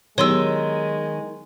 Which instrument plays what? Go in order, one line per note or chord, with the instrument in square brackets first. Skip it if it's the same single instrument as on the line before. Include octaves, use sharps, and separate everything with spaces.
[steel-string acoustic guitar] D#3 [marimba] F#3 B3 G4 [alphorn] G#3 [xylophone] C#5 C6 E6